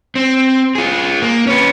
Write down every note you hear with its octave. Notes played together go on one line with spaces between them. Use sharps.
C4
F4 G#4
A#3
C#4 B4